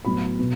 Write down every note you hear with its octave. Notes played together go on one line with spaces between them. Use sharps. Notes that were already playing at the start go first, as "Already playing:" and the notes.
A2 F#3 B3 B5
B2